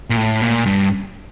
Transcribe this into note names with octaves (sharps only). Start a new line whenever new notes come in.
A#2
A2
A#2
G2